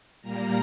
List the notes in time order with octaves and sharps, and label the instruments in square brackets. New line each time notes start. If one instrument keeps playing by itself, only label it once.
[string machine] A#2 G3 A#3 A#5